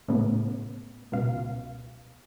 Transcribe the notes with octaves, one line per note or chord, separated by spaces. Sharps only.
A2 C#3 B3
C#2 B2 F5